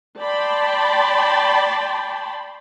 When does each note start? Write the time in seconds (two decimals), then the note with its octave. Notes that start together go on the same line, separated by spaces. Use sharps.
0.21 D5 G5 A5 B5 C6